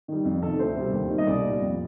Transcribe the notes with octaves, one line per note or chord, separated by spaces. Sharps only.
D#3 G3
F2
C3 D#3 A4
D2 C5
C3 G3
D#2
D#3 G3
D#5
C2 D5
A#2 G3
F2